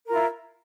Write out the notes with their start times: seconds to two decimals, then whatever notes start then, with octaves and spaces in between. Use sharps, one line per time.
0.07 A#4
0.10 F4
0.13 E4